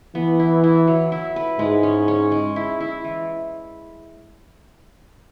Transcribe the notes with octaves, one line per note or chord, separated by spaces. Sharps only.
E3 B3
E4
E4
F#3
E4
B4
G#2 G#3
C#4
C#4
G#3
E4
E4
E3